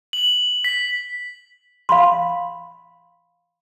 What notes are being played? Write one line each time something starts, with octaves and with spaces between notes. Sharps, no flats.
F#7
B6
F5 B5 C6